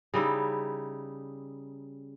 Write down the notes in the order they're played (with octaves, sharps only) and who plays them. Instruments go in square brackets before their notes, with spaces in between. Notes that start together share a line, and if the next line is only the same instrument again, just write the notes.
[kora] C#3 G3 D#4 E4